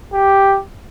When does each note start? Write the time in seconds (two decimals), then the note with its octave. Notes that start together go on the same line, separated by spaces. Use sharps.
0.13 G4